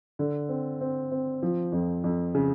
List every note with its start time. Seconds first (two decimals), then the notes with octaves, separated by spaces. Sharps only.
0.19 D3
0.49 C4
0.81 C4
1.12 C4
1.43 F3
1.72 F2
2.04 F2
2.35 C#3